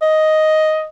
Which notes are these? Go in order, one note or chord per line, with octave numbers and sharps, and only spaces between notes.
D#5